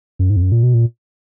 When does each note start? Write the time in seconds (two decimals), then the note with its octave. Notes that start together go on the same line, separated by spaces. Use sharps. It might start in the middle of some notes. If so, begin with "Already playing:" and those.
0.19 F#2
0.30 G#2
0.36 F2
0.42 F#2
0.52 A#2
0.63 B2
0.74 A#2